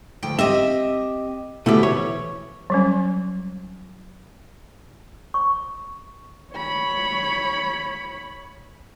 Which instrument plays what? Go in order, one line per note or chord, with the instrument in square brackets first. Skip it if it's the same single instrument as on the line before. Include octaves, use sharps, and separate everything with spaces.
[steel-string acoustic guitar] D2 F3 G5
[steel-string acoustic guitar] C4 G4 D#5 [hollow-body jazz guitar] E5
[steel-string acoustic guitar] D2 D3 G4 [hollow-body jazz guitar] B2 A3 E4
[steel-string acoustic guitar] E3 [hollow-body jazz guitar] C#5
[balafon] F#3 G3 C#4
[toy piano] C#6
[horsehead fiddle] C#5 B5